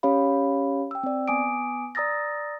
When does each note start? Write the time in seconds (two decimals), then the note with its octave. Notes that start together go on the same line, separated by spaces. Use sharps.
0.03 C#4 G4 C#5 F5 B5
0.91 G5 E6
1.03 C4 D5
1.28 B3 G#5 D6 D#6 D7
1.95 D5 A#5 D#6 E6 A6 A#6